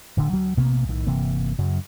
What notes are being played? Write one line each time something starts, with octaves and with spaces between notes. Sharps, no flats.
D1 D2 D3
D2 F#3
A1 B2 A#3 B3
B1 A2 D#3
G1 C3 E3 A#3
F#2 C#3 F#3